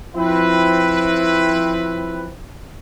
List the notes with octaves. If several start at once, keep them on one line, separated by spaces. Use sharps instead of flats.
F3 C4 E4 B4